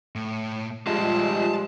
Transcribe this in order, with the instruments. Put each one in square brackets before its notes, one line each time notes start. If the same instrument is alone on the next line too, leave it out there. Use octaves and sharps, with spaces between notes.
[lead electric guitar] A2
[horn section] F3 G3 G#3 [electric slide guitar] F4 G4 D#5 [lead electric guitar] A5